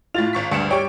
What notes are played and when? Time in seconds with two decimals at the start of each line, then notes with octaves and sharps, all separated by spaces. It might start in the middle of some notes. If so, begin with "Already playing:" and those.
0.14 A2 F4 A6 F7
0.33 G#1 C#6 B6
0.51 D2 G2 C#7 E7
0.71 G3 C#5 G5 C#6